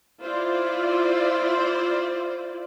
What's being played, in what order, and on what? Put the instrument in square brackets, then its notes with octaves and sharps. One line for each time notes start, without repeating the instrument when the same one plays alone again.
[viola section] E4 F4 C5 D5